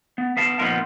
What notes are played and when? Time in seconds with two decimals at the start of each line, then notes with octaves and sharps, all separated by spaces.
0.18 B3
0.37 B3 F5 A5
0.59 A#2 F3 B3 D#4 F4 A#4